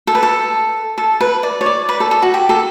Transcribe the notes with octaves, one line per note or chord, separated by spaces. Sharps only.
A4
B4
A4
A4
B4
D5
C#5
D5
B4
A4
A4
F#4
G4
A4